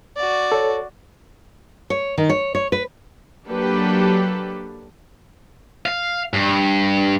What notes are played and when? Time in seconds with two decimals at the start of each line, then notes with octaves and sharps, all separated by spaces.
0.16 F#4 D5
0.52 A4 C#5
1.90 C#5
2.18 D#3
2.29 C#5
2.55 C#5
2.72 B4
3.46 F#3 A#3 D4 G4 A4 B4
5.86 F5
6.34 G2